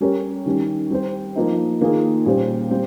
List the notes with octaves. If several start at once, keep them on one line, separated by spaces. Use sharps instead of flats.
G3 C#4 G4 A#4 C#5
D#3 G3 C#4
G3 C4 G4 C5
F3 A#3 D#4
D#3 A#3 F4 G#4
A#2 G3 C#4 G4 C5
G3 C4